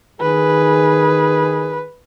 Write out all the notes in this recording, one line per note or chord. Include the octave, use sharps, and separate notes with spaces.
D#3 G#4 B4